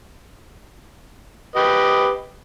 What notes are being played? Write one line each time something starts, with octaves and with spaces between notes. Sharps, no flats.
G4 B4 D#5